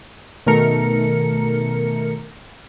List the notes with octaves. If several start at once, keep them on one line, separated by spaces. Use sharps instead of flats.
B2 D#3 A3 A#4 C#7